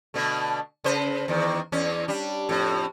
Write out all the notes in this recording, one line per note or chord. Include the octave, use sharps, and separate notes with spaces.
B2 D3 A3
C#3 B4 C5
E2 D#3
E2 C#4
G3 D4
F2 A2